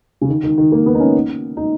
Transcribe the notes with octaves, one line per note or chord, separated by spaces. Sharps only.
C#3
D#3
D#3
D#3
A#3
B3
D#4
C#4
D#4